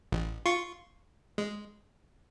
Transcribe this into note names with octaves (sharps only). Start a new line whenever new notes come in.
A1
F4 C6 C#6
G#3